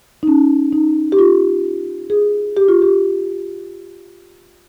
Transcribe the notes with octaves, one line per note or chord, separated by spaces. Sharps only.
D#4
C#4
D#4
G4
F4
G#4
G4
F4
G4